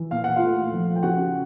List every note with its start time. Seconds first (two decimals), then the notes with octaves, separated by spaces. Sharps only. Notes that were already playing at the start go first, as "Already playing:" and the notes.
Already playing: E3
0.11 A#2 F5
0.24 F#5
0.36 F4 F5
0.42 A3
0.73 F3
0.96 G5
1.03 C#3 F#4 F#5